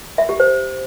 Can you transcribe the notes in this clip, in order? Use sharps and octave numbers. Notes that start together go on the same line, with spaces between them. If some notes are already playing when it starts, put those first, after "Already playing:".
E5
G4
C5